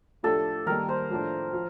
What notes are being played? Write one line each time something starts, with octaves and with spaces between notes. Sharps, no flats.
A2 F3 A3 D4 G4 A4
D#3 G3 A#3 A#4
C5
A2 F3 A3 D4
F3